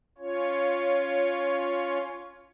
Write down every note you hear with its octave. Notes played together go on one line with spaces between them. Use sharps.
C#4 F4 C#5